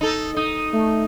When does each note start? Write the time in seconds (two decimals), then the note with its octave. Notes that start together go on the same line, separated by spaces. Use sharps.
0.01 D#4 A4
0.37 D#4 D#6
0.73 A3